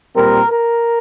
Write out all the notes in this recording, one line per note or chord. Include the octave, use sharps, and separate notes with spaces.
A#2 G3 C4 A#4
A#4